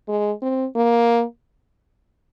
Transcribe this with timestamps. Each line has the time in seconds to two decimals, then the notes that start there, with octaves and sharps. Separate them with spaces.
0.08 G#3
0.42 C4
0.76 A#3